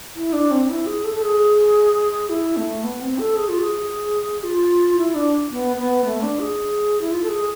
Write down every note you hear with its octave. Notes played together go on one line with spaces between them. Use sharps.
E4
D4
C4
E4
G#4
A4
A4
G#4
E4
A3
B3
C4
A4
G#4
F4
G#4
F4
E4
D4
B3
B3
A3
D4
G#4
E4
F4
A4
G#4